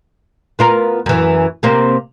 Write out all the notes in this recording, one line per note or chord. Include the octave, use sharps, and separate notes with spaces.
B3 F4 A#4
F#2 E3
C3 A#3 C4